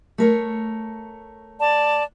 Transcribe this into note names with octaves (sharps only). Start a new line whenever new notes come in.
A3 A#4 C#5
D5 A5